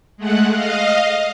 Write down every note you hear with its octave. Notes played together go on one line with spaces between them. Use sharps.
G#3 A3 F#5 F#6
D#5 F5